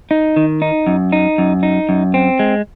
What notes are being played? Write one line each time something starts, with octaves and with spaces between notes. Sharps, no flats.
D#4
D#3
D#4
F#2
D#4
F#2
D#4
F#2
C4
G#3